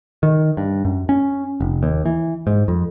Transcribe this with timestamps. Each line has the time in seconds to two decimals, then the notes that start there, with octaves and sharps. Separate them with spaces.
0.23 D#3
0.57 G2
0.85 F#2
1.09 C#4
1.60 F1
1.83 D#2
2.06 E3
2.47 G#2
2.68 F2